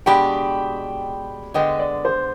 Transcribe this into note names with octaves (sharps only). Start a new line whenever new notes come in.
B2 G#3 D4 G4 G5 B5
D3 G#3 B3 D#5 G5
D5
C5